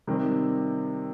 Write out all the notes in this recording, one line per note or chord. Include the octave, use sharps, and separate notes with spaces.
C3 D#3 G3 C4